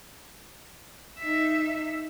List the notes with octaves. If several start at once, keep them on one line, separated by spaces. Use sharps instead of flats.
D#4 E5